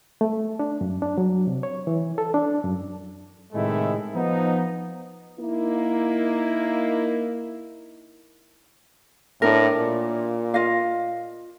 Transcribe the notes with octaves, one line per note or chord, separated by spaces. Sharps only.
A3
D4
F#2
D4
F#3
C3
C#5
E3
A4
D4
F#2
A2 C3 D#3 G#3 A3 E4
F3 B3 D#4
A#3 D#4 E4
A2 D4 A#4
A#2
F4 D#5 F5